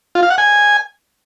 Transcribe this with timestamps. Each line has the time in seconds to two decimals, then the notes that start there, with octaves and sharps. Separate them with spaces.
0.15 F4
0.23 F5
0.30 F#5
0.38 G#5